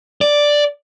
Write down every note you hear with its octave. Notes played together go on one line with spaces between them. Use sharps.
D5